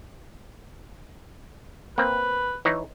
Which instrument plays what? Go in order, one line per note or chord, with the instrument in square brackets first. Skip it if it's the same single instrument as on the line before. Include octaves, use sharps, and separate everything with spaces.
[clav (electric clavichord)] A#3 C4 [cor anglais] B4
[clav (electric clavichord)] E3 D#4 C#5